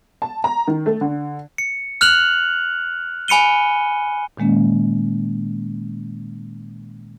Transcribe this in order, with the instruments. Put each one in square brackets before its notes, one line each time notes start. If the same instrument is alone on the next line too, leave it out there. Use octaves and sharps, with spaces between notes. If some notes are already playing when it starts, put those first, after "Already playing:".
[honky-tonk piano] A5
A#5
D#3
A3
D3
[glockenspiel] C#7
F6 F#6 F7 F#7
G#5 B5 C#7 D#7 G7
[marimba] A#2 D#3 G#3 A#3 C#4